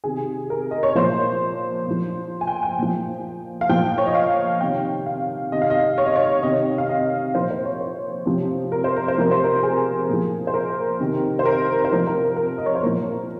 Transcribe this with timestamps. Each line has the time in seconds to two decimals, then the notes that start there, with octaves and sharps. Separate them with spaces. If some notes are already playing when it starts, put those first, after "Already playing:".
0.04 C3 D#3 G#4
0.50 A#4
0.71 D#5
0.83 C#5
0.95 A#2 F3 C5
1.87 A#2 F3
2.41 G#5
2.47 G5
2.63 G5
2.78 A#2 F3
3.61 F5
3.69 A#2 F3 G5
3.98 C#5
4.06 D#5
4.15 F5
4.61 C3 D#3 G5
5.06 F5
5.52 C3 D#3 D#5
5.62 F5
5.70 D#5
5.98 C#5
6.06 D#5
6.16 C#5
6.43 C3 D#3 D#5
6.78 F5
6.89 D#5
7.35 A#2 F3 C5
7.51 C5
7.65 C#5
7.81 C5
8.26 C3 F3
8.72 A#4
8.84 C5
8.96 A#4
9.08 C5
9.18 C3 F3 A#4
9.31 C5
9.44 A#4
9.63 G#4
10.09 A#2 F3
10.47 C5
10.54 A#4
11.00 C3 D#3
11.39 C5
11.45 A#4
11.85 C5
11.91 C3 F3 A#4
12.07 A#4
12.37 A#4
12.58 D#5
12.66 C#5
12.75 C5
12.83 A#2 F3 A#4